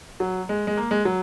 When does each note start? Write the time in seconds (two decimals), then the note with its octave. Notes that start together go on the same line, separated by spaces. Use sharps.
0.20 F#3
0.49 G#3
0.67 G#3
0.77 A#3
0.91 G#3
1.05 F#3